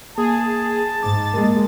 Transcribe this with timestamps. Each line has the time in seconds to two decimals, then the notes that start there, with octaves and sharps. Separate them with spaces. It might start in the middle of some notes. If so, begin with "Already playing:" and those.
0.18 A#3 G#4 A5
1.03 G#2 D6 A6
1.34 G#3 A#3 A#4